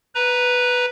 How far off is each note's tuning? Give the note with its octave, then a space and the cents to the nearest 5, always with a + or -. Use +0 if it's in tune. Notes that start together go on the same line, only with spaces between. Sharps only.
B4 +0 A#5 +15